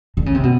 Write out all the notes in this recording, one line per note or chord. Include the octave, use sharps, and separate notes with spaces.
D3
C#3
C3
B2